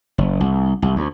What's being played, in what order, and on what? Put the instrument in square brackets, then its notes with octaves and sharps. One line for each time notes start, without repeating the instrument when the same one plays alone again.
[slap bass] F#1
C2
C2
D2